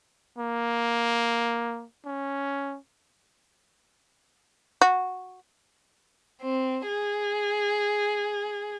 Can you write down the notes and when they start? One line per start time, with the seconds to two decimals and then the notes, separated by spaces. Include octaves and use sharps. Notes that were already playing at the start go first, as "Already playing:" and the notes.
0.38 A#3
2.05 C#4
4.81 F#4
6.41 C4
6.88 G#4